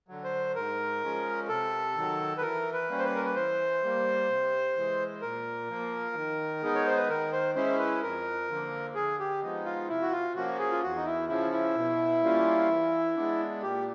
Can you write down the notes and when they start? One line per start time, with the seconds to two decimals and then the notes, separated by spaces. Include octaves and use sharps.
0.08 D3 F#3
0.24 C5
0.55 G#2 A#4
1.02 F3 G#3 C#4
1.48 C3 A4
1.95 D#3 F#3
2.38 B4
2.42 E3 A#4
2.73 B4
2.89 G3 A#3 C#4
2.98 C5
3.04 B4
3.15 A#4
3.25 B4
3.35 E3 C5
3.82 G3 A#3
4.29 C3
4.76 E3 G#3
5.22 A#2 A#4
5.69 F3 A#3
6.15 D#3
6.62 G#3 B3 D#4
6.75 C#5
6.86 C5
6.97 B4
7.08 D#3 A#4
7.32 C5
7.55 G#3 C#4 E4 C5
7.78 B4
8.02 F2 A#4
8.49 D3 F3 A#3
8.95 D3 G#4
9.19 G4
9.42 F3 G#3 B3 D#4
9.65 F4
9.89 C3 E4
10.02 F#4
10.12 F4
10.35 F3 A#3 C#4 F#4
10.59 G#4
10.71 F4
10.83 E2 F#4
10.97 D#4
11.05 E4
11.29 C#3 F3 E4
11.52 E4
11.75 B2
12.22 G3 A#3 C#4 F4
12.69 E3
13.16 G#3 B3 D4
13.62 A#2 G4